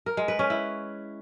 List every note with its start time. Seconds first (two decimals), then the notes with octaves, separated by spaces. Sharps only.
0.06 A#4
0.17 G#3
0.28 B4
0.39 C#4
0.50 E4